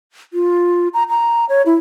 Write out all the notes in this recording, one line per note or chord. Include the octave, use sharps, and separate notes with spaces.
F4
A#5
A#5
C#5
E4